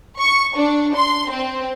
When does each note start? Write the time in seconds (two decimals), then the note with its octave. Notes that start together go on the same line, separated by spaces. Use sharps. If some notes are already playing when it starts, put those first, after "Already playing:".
0.20 C#6
0.57 D4
0.95 C6
1.30 C4